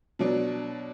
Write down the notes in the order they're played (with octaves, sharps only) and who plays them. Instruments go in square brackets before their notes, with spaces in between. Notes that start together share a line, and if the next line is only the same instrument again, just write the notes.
[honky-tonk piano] B2 F#3 D4